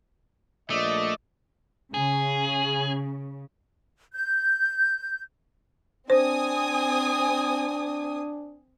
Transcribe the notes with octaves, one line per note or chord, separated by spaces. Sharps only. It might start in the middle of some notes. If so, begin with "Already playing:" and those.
A#1 A3 D5 D#5
C#3 G#4
G6
C4 D4 C5 G#5 D#6